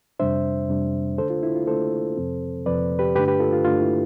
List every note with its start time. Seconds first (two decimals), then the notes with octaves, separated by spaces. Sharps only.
0.20 F2 C3 G3 D4 C5 E5
0.69 F2 C3 G3 D4
1.18 D3 A3 D4 A4 C5
1.30 F4
1.43 E4
1.55 F4
1.67 D3 A3 D4 A4 C5
2.17 F2 C3 F3 C4
2.66 F2 C3 F3 C4 B4 D5
2.99 G4 B4
3.16 G2 D3 A3 D4 G4 B4
3.28 G4 B4
3.40 F4 A4
3.53 F4
3.65 G2 D3 A3 D4 F4
3.81 E4